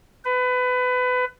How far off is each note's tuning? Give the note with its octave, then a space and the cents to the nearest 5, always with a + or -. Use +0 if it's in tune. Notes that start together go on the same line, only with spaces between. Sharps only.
B4 +25